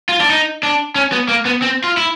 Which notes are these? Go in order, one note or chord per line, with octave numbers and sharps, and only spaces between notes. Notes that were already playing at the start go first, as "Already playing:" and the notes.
F4
D4
D#4
D4
C#4
B3
A#3
B3
C4
F4
E4